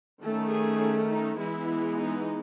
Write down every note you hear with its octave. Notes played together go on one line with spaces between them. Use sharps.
D#3 A3 C#4 A4
G#4
D#4
E3 G#3 B3 E4
D#4